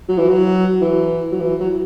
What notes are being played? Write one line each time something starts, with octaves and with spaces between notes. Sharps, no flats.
F#3
E3
F#3
E3
F#3
E3
F#3